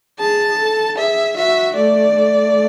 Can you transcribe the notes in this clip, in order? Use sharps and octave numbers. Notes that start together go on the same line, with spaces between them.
G#4 A5
A4
G#4 E5
F#4 E5
A3 D5
A3